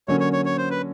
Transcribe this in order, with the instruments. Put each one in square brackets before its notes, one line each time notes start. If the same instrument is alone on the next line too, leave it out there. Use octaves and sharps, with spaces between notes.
[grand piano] D3 F#3 A#3 C#4 [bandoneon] C#5
[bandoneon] C#5
C#5
C#5
C5
B4